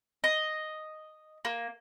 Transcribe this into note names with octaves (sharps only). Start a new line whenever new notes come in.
D#5
A#3